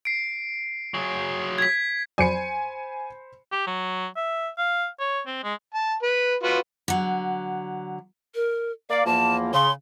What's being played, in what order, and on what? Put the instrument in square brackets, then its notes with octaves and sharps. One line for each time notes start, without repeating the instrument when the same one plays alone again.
[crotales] C7 D7
[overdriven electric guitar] F#3 G#4
[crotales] G#6 B6
[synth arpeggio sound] F2 F#3 D5 [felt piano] C5 B5 [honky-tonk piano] G#5 C#7
[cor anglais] G4
F#3
E5
F5
C#5
C4
G#3
[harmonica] A5
B4
F4 F#4 B4
[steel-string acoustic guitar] D3 F#3
[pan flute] A#4
[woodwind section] A#3 D5 [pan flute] F5
[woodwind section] E2 F3 A#3 [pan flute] A5
[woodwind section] C#3 [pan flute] C6